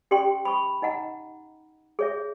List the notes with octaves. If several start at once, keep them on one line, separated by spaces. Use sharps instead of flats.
C#4 G4 D5 G5 C6
B5 C#6
D#4 D#5 F#5 A#5
G#4 C#5 E5